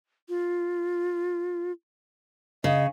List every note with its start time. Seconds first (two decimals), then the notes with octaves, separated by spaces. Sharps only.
0.29 F4
2.64 C#3 D#5